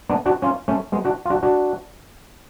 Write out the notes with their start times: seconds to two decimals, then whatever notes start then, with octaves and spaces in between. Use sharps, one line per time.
0.09 B3 D4
0.26 D4 F#4
0.42 C#4 F4
0.68 A3 C#4
0.92 G#3 B3
1.05 D4 F#4
1.25 F4
1.30 D4 F#4
1.43 D4 F#4